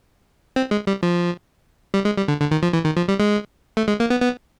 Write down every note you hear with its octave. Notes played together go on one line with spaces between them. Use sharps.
C4
G#3
G3
F3
G3
G#3
G3
D3
D3
D#3
F3
E3
D#3
F3
G3
G#3
A3
G#3
A#3
B3
B3